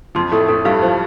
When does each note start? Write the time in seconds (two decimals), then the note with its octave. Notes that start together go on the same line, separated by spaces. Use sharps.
0.15 F2 F3 C6
0.32 A2 A3 A4
0.48 A2 A3 A4
0.65 G2 G3 F5
0.82 F3 C5